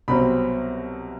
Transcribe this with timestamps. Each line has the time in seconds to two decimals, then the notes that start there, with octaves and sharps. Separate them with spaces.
0.08 C2 B2 F#3 C4 B5